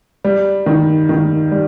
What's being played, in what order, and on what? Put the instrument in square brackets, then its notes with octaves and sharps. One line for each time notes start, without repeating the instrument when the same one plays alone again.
[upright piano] G3
D#3
D#3
G3